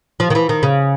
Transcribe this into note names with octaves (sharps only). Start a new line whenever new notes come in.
F3
D#3
E3
D#3
C#3